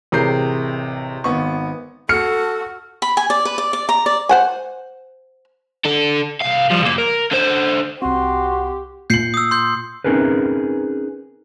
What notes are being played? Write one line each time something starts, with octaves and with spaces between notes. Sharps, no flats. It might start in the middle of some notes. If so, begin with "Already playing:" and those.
A1 C3 G#4 A#4 G6 C7
G#1 B3 C#6
F#4 A4 F6 C#7
B5
G#5
D5
B4
D5
D5
A#5
D5
C5 F#5 G#5
D4 A4
C2 F5
F3 G3
C#3 A#3
A#4
D3 C5
C2 C4 F#4 G4 C6
A#2 G6 C7 C#7 F#7
D#6 E6
C6 G6
C4 C#4 D#4 G#4 A#4 B4